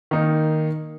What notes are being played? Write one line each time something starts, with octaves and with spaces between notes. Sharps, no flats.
D#3 A#3 D#4